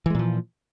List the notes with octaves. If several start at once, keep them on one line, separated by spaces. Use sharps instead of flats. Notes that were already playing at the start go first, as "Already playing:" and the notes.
A#2 E3 F3 G#3